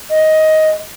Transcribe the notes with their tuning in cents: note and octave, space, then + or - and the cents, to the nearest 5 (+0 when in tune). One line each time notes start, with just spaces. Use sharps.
D#5 +10